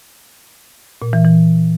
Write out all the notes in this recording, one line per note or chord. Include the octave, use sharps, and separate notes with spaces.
A#2
E3
E3